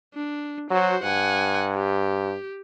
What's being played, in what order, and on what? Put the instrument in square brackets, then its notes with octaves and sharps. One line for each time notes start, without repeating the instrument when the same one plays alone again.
[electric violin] D4
[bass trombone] F#3 [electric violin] F#4 C5
[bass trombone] G2 [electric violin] F#5 G#5
[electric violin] G4